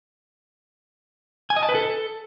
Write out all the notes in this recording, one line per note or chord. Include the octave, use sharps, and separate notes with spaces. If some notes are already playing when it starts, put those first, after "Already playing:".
G#5
D#5
A5
B4
A4